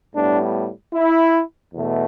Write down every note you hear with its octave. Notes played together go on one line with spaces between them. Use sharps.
A2 G3 B3 D4
E4
E2 B2 A3